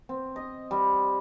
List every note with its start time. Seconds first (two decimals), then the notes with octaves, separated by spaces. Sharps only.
0.09 C4
0.36 D#5
0.71 G3